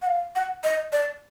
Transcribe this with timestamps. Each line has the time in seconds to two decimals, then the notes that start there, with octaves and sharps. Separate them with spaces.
0.02 F#5
0.07 F5
0.35 F#5
0.64 D#5
0.92 D5